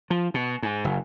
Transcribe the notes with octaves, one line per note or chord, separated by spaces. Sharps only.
F3
B2
G#2
F#1